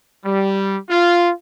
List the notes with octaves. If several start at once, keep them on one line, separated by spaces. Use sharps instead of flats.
G3
F4